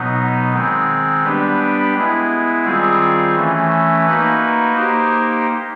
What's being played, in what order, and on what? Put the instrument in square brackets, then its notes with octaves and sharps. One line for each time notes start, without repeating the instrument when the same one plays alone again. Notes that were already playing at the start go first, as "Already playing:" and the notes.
Already playing: [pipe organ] B2 F#3 B3 D#4
D#3 G#3 C4
G3 B3 D4 G4 B4
G#3 B3 E4
D#3 G3 C4 F4 G#4
E3 A3 C#4
A#3 D#4 F#4 B4
A#3 D#4 G4 C5